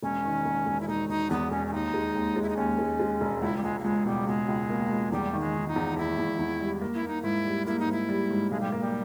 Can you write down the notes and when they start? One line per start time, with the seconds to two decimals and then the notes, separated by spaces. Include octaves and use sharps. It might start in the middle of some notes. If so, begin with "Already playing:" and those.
0.02 E1 C#4
0.24 D#3
0.45 E1
0.66 E1
0.80 E4
0.88 E1 D#4
1.09 E1 D#4
1.30 E2 B3
1.51 E1 C#4
1.67 C#4
1.72 D#2 D#4
1.94 G#3
2.15 D#2
2.36 G#3
2.42 E4
2.49 D#4
2.57 D#2 C#4
2.79 G#3
3.00 G#3
3.21 E1
3.42 C#2 E4
3.57 G3
3.63 C#2 G#3
3.79 A#3
3.84 C#2 G#3
4.06 B2 G3
4.27 C#2 G#3
4.48 C#2
4.70 A#3
4.91 C#2
5.12 E2 G3
5.33 D#3
5.40 G#3
5.54 D#3
5.68 D#4
5.76 E2
5.96 E2 E4
6.18 E2
6.39 E2
6.60 G3
6.81 A#3
6.95 E4
7.03 A#3
7.08 D#4
7.22 G#2 E4
7.45 G3
7.67 A#3 E4
7.79 D#4
7.87 G#2 E4
8.09 G3
8.30 G#2
8.51 B1 G#3
8.60 G3
8.72 A#3
8.80 G3